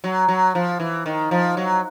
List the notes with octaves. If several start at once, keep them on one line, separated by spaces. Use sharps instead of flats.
F#3
F#3
F3
E3
D#3
F3
F#3